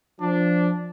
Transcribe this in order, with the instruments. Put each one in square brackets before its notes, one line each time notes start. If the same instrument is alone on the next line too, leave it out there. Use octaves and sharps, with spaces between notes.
[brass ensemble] F3 D4